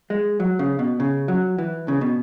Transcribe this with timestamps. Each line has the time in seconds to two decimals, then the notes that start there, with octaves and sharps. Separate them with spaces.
0.10 G#3
0.40 F#3
0.59 C#3
0.79 B2
1.00 C#3
1.28 F#3
1.58 E3
1.88 C#3
2.01 B2